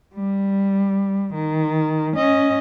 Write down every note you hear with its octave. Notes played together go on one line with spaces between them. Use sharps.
G3
D#3
C#4 D#5